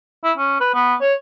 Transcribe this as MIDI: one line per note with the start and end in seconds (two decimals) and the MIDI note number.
0.24 0.32 64
0.37 0.57 61
0.60 0.71 71
0.74 0.94 59
1.01 1.14 73